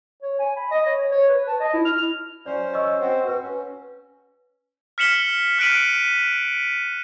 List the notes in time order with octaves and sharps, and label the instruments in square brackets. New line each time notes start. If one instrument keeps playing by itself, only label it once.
[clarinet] C#5
G#5
B5
D#5
C#5
C#5
C#5
B4
A5
D#5
E4
F6
[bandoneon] F#3 C#4 C5 [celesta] D5
[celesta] D#5 C#6 E6
[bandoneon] C4 F#4 C5
[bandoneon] F#4 [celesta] B4
[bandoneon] C#4
[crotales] F6 B6 C#7 E7 F#7 G7
F6 F#6 B6 D7 D#7 F#7